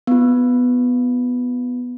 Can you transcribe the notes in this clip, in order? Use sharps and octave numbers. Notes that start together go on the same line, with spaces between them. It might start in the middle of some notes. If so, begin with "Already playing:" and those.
B3 F4